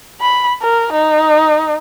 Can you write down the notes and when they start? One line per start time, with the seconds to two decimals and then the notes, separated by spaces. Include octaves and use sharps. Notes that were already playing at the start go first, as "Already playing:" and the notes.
0.21 B5
0.62 A#4
0.92 D#4